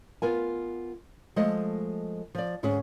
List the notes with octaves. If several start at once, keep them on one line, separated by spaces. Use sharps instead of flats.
B3 F4 A#4 G#5
F3 G#3 A3 A4 D#5
F3 D5
D2 G#2 C#4 G#4